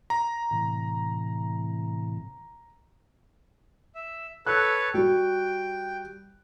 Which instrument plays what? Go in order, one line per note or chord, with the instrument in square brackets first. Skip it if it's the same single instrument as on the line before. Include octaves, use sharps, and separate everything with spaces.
[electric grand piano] A#5
[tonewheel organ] A2 C3 E3
[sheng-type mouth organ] E5
[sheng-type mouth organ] A4 B4 C#5 [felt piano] F#6
[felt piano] G3 F#4 [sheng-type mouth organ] G5